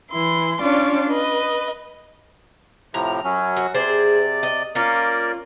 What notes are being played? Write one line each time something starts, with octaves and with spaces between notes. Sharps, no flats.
E3 E4 C6
C#4 D4 F4 C#5 D5
B4 D#5
A2 C3 F3 A#5
F#2 F#3 C#4
F#4
C3 G#4 C5 D5
D#5
A#3 C#4 F4 A#4 D5